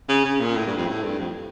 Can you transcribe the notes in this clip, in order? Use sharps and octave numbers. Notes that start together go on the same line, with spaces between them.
C#3
C#3
A#2
A2
G2
F2
A2
G2
F2